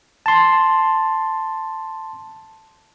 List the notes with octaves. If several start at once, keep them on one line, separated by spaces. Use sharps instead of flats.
A5 C6